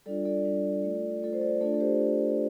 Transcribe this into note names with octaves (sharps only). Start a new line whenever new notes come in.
G3 D4 F4 A4 D5
A4 D5
G3 D4 F4
A3 F4
A3 F4 A4
C5
A4 D5
A3 D4 F4 A4 D5
A4
G4 C5